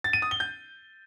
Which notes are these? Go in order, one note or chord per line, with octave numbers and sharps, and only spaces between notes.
A6
D#7
D#6
G7
G6